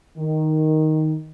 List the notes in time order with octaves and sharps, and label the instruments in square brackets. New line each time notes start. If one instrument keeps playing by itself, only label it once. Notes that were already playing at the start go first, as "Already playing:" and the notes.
[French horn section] D#3